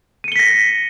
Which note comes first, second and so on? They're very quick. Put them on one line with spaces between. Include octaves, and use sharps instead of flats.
D#7 C#7 G7 B6 A#6